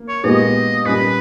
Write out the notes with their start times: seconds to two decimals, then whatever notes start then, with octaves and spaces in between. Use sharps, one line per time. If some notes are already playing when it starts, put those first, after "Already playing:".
Already playing: A#3
0.08 C#5
0.24 A#2 G#3 B3 G4 D#5
0.85 A#2 G3 C#4 B4